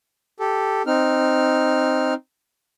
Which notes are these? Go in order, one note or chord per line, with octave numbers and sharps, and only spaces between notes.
G4 A4
C4 D#4 F6